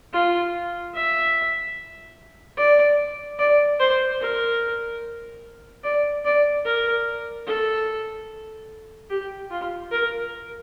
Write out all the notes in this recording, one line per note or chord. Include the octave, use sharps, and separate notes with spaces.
F4
E5
D5
D5
C5
A#4
D5
D5
A#4
A4
G4
F4
A#4